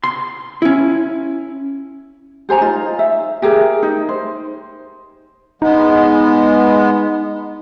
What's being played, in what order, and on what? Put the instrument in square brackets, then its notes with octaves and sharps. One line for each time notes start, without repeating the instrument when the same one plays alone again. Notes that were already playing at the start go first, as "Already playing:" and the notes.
[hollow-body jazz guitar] C6
C#4 E4
[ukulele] G4 C5 G#5 A#5
D#4 F4
E5
G4 G#4 A#4 E5
D#4
C5
[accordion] G#3 B3 [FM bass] D#4